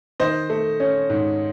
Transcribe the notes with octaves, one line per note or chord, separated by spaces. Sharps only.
D#3 C5 D#5
A3
C#4
G#2